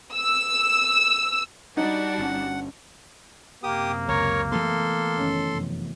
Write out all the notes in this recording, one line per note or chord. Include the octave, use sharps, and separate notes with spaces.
E6
G3 D4 D#4 F#4 F#5
G1 A#2 C#4
F#2 C3 A#3 G4 D#6
C#2 A#4 C#5
E3 A3 B3 A4 C6
F#1 D#3 C#4
F1 F#2